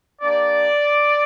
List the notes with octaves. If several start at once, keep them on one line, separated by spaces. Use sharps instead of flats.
A#3 D4 G4 D5